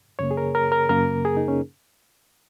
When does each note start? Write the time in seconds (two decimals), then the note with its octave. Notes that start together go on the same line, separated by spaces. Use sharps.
0.19 F#2 C#3 A#3 C#5
0.31 G#4
0.37 A#4
0.55 A#4
0.72 A#4
0.89 F#2 C#3 A#3 A#4
1.25 G#4
1.37 D#4
1.48 C#4